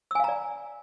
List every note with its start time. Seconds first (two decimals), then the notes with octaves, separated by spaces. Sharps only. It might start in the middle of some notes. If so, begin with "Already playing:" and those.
0.11 E6
0.15 G#5
0.20 F5
0.24 A#5
0.28 D5